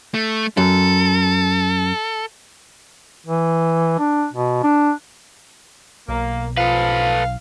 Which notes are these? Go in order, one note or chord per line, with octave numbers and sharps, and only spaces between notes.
A3
F#2 A4
E3
D4
B2
D4
B1 A#3
F3 A4 B4 F5